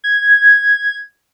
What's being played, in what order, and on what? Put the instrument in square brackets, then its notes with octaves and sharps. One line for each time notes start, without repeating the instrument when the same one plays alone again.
[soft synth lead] G#6